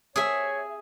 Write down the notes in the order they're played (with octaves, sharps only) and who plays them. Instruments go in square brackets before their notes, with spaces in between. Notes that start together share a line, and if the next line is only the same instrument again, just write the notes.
[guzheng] G#4 E5 [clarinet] C#5